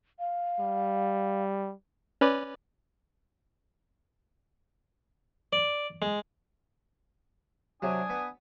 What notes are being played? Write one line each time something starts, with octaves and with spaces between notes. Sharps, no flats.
F5
G3
C#4 B4 D5
D5
G#3
C3 F#3 D4 G#5 D#6
B3